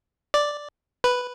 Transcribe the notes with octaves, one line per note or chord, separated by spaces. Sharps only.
D5
B4